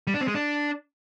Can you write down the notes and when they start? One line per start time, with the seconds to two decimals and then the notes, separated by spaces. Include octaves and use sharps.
0.07 G3
0.14 D4
0.21 C4
0.28 G#3
0.35 D4